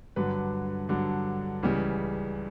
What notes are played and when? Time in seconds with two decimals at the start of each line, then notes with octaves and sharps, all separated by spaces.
0.16 G2 D3 F#3 B4
0.89 G2 D3 F#3
1.63 C#2 C#3 E3 G3